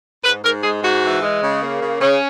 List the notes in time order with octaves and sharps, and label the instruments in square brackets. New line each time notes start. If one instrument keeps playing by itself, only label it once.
[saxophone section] G#2 B4
G#2 A#4
G#3 G#4
G#2 F#4
E3
G#3
C#3
A#3
C#3
C#3 C#4